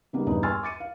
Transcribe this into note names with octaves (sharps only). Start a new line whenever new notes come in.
C#3 G3 A#3 B3 D#4
E2 G2 A#2 D#4 B4
G#5 C6 C#6 E6 F6 A6
D6 A6 C#7 D#7
F5